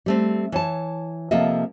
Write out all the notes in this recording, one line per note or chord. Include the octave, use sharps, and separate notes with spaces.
G3 A3 C4
E3 C#5 A5
C3 F3 A#3 A4 D#5 E5